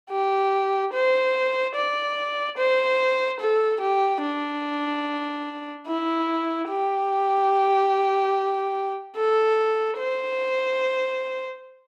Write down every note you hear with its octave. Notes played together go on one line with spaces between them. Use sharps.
G4
C5
D5
C5
A4
G4
D4
E4
G4
A4
C5